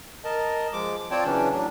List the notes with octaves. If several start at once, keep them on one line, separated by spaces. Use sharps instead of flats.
A#4 D#5 A5
F3 G#3 D6
C4 F4 C#5 D5 G5 A5
C#3 E3 F#3 C#4 D4
A2 F#3 D4